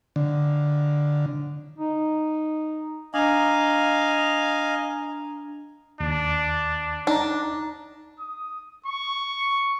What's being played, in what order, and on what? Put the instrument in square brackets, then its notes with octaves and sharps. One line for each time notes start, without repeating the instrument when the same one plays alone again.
[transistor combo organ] D3
[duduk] D#4
[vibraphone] D4 A#5 [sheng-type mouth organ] D#5 F5 G#5
[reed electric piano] D#2 [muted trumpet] D4
[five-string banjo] D4 [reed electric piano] D#4 A#5
[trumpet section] D#6
C#6